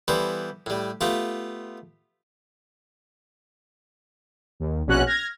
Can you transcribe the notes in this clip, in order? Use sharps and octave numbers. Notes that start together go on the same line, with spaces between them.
E3 G3 B3 A4 C5
A2 G3
A3 B3 F4 G4
D#2
A#1 B2 C#4 F#4 F#6
F6 G#6 A#6